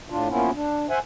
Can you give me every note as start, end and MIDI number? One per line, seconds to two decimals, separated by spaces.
0.10 0.28 45
0.10 0.28 62
0.10 0.28 65
0.29 0.50 53
0.29 0.50 58
0.29 0.50 59
0.29 0.50 61
0.29 0.50 64
0.29 0.50 65
0.54 0.87 62
0.90 0.99 72
0.90 0.99 76
0.90 0.99 78
0.90 0.99 80